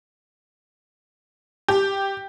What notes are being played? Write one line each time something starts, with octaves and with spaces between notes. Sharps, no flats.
G4